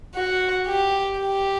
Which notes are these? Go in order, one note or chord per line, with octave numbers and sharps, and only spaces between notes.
F#4
G4
G4